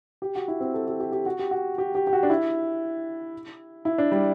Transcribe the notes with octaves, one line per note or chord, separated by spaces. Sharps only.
G4
F#4
E4
C4
A4
G4
G4
G4
F#4
G4
F#4
G4
G4
G4
F#4
D4
E4
E4
D4
G3